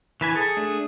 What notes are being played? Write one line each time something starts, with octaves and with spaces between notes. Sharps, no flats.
E3 B4 G#5
G#4 A4
A3 D4